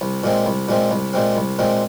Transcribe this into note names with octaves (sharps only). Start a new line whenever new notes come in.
C2
A#2 G#3 C4
C2
A#2 G#3 C4
C2
A#2 G#3 C4
C2
A#2 G#3 C4